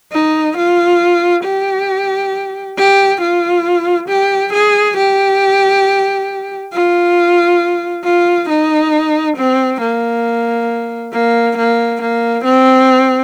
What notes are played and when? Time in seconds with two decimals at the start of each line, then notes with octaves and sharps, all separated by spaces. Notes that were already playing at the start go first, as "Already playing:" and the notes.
0.13 D#4
0.57 F4
1.45 G4
2.78 G4
3.21 F4
4.08 G4
4.53 G#4
4.97 G4
6.73 F4
8.05 F4
8.49 D#4
9.37 C4
9.81 A#3
11.13 A#3
11.57 A#3
12.02 A#3
12.44 C4